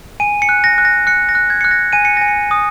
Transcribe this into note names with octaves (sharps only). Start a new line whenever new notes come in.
G#5 D#7
C#7
F#6
A#6
F#6
A#6
F#6 C#7
A#6
F#6
G#6
F#6 C#7
A#6
G#5 D#7
C#7
G#5 A#6
C#7
D#6